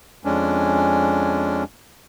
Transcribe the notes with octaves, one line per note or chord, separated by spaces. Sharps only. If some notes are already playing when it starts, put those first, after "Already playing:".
F2 G#3 C#4 D4